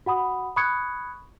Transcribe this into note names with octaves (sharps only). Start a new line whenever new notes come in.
F#4 F#5 B5 D#6
B5 C#6 D#6 F#6 G#6 C#7